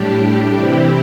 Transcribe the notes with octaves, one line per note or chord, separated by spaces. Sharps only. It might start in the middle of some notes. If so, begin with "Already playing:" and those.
Already playing: A2 G3 D4 G4
C3 E3 C4 E4 G4